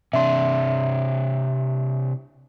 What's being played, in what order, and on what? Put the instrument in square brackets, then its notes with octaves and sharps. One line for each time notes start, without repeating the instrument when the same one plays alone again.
[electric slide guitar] C3 D4 [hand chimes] E5 C6